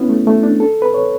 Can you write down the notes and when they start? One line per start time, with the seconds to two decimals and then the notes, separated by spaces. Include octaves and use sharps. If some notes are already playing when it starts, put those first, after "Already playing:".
Already playing: B3 C#4 E4 F#4
0.09 A3
0.27 A3
0.43 D4
0.60 A4
0.82 B4
0.94 C#5